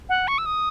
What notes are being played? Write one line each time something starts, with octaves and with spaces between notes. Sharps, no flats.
F#5
C#6
E6
D#6